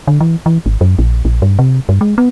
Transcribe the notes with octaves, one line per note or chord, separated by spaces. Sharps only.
D3
E3
E3
G#1
F#2
A#1
A#1
G2
C3
G2
G#3
B3